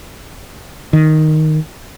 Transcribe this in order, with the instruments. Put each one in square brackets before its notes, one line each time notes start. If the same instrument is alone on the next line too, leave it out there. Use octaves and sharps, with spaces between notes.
[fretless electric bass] D#3